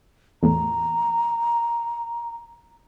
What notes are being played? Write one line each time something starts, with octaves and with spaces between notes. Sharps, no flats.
E2 A2 A#5